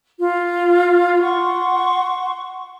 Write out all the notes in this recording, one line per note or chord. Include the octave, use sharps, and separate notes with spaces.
F4
F#5 C6 C#6